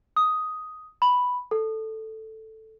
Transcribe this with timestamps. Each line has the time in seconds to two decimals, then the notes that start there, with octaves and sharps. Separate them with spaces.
0.16 D#6
1.02 B5
1.51 A4